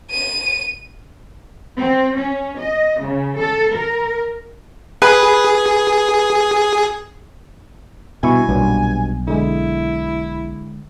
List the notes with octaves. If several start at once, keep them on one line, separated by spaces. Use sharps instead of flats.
D#7
C4
C#4
D#5
C#3
A4
A#4
G#4 B4
G2 B2 E4 G#5 C#6
B1 G2 A#2 F#3
D3 G#3 E4